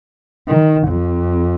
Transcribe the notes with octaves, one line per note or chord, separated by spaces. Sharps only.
D#3
F2